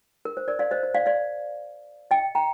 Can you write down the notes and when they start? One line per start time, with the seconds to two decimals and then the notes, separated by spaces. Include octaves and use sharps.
0.25 A#4
0.37 C5
0.48 A#4 D5
0.59 D5 F5
0.71 C5 D#5
0.83 C5
0.95 D5 F5
1.06 D5 F5
2.11 D#5 G5
2.35 G5 A#5